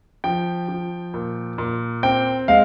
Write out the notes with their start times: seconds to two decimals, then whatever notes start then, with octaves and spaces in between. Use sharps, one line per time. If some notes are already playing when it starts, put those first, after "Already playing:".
0.24 F3 G5
0.68 F3
1.14 A#2
1.58 A#2
2.03 C4 G5
2.48 G#3 F5